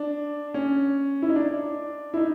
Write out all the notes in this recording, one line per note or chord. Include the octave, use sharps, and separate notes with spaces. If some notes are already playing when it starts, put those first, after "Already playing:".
Already playing: D4
C#4
E4
D#4
D4
E4
D#4